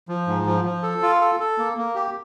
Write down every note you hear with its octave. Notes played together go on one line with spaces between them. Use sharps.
F3
G#2
F3
F3
A4
F4
A4
A4
A#3
A#3
G4